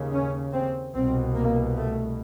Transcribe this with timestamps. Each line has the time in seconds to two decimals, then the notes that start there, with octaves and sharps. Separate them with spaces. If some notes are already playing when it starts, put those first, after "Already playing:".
Already playing: D#2 C#3
0.12 C#4
0.53 C4
0.94 C2 B2 C4
1.36 A#3
1.76 A3